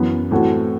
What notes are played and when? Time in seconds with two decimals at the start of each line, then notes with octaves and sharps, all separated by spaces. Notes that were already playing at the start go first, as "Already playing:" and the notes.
Already playing: F#2 E3 B3
0.31 A2 E3 A3 C4 F#4